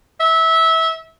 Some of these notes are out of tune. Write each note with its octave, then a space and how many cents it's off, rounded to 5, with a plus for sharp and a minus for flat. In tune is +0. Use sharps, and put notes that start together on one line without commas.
E5 -20